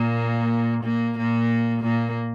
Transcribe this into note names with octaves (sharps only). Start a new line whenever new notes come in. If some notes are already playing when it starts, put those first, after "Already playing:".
Already playing: A#2 A#3
A#2 A#3
A#2 A#3
A#2 A#3